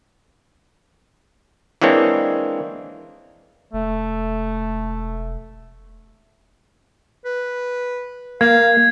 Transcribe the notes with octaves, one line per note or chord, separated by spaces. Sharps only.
E3 G#3 A#3 C4 D4 C#5
E1 A3
B4
A#3 F5 G#6